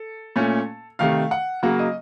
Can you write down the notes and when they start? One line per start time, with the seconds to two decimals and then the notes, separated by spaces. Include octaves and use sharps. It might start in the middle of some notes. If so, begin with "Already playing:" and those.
Already playing: A4
0.36 A#2 A3 C#4
0.99 C3 D#3 A3 F5
1.31 F#5
1.63 C#3 F#3 A#3 F#5
1.79 D#5